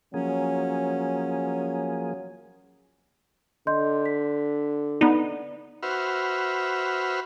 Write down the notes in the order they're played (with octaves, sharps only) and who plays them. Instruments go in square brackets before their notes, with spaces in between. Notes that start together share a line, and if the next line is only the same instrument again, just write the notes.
[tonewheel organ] F3 A#3 G#4 [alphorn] F#3 [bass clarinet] C#4
[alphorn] D3 [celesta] D#5 C6 G6
[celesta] B6
[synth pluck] B3 D#4 [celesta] D5
[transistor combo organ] F#4 B4 C5 E5 F6